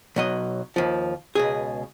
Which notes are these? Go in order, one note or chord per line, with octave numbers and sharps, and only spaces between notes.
B1 F#3 D#5
D#2 F3
C#2 B2 G#4